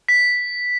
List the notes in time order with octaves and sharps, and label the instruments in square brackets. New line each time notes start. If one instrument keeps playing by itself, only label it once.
[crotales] B6